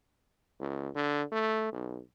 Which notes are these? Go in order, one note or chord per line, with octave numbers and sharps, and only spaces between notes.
C#2
D3
A3
B1